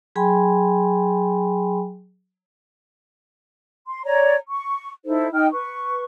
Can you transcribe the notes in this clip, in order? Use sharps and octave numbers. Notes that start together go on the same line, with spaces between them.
F#3 G#4 G5 G#5 B5 C6
C6
C#5 D5 A#5
C#6
D#4 E4 A4 C5
D#4 G5 F6
B4 C#6